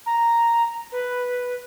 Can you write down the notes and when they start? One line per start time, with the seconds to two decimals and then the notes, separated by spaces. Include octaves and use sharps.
0.06 A#5
0.92 B4